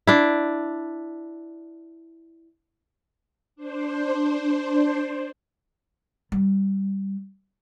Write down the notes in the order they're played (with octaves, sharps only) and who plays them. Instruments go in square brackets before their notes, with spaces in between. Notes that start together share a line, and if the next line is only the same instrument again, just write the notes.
[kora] D4 E4
[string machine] D4 C5
[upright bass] G3